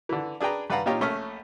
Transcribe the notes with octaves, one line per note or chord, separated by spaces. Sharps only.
D3 E3
D4 G#4 B4 G5 A#5
G2 B4 D5 F5 F#5 A#5
A#2 D#4 F4 G4 C#5 A#5
A#1 A3 C#4 F6